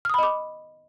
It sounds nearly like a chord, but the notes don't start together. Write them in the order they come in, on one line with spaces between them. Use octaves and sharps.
F6 D#6 B5 D#5 D6